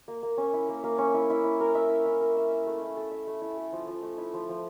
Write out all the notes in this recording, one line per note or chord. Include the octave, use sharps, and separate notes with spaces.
A#3
A#3
C#4
E4
A#3
A#3
C#4
E4
E4
E4
A#4
E5
E4
E4
A#4
E5
E5
A3
E4
A4
E5
A3
E4
A4
F3
F3
A3
E4
F3
F3